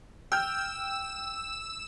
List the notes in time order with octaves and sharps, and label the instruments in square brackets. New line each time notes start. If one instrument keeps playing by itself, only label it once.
[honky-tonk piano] G5 F6 G6 [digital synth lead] E6